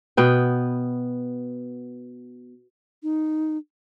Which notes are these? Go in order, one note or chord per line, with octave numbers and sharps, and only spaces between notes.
B2 B3 G5
D#4